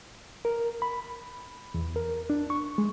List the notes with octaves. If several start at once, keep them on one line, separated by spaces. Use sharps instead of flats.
A#4
B5
E2
A#4
D4
C#6
G#3